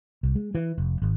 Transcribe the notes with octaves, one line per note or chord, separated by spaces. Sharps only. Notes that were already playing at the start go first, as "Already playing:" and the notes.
C2
G#3
E3
F1
G#1